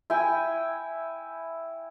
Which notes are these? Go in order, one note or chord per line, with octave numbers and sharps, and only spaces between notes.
E4 G5 G#5